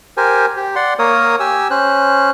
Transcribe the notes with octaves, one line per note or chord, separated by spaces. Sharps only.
G4 A#4 C5 G#5
G4
D5 F#5 C6
A#3 A#4 C#5 D#6
G4 G#5 E6
C#4 C5 F#6